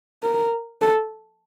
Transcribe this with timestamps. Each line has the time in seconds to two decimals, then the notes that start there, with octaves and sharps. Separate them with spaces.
0.23 A#4
0.81 A4